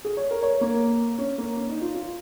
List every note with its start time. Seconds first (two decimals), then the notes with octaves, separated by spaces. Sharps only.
0.05 G#4
0.17 C#5
0.31 A#4
0.43 C#5
0.61 A#3
1.18 C#4
1.38 A#3
1.57 C#4
1.69 D#4
1.82 F4
1.95 F4